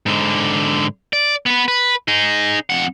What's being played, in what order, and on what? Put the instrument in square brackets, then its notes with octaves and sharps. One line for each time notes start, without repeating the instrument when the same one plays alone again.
[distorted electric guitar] G#2 D3
D5
B3 B4
B4
D#4 G#4
F2 F#5